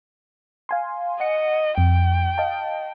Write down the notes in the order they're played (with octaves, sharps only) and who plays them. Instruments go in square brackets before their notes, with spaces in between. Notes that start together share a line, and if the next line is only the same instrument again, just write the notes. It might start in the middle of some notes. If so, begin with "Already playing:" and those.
[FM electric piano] F5 G#5 C6
[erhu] D#5 [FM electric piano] F#5 C#7
[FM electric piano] F2 [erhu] G5
[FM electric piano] D#5 F5 A5